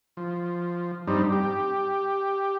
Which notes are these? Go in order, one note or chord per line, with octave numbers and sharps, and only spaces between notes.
F3
G2 G3 C4 D#4
G4